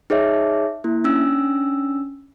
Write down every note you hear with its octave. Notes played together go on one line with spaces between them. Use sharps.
D#4 G#4 C#5 D#5 E5
A#3 E4
C#4 D4 E6